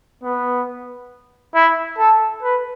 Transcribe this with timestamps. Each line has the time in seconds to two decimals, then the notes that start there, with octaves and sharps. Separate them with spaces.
0.23 B3
1.54 E4
1.98 A4
2.42 B4